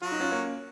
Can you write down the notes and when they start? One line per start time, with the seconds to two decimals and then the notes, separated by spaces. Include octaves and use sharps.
0.02 F#3 F4 F#4
0.12 D#4
0.20 C#4 F4
0.31 A#3 C#4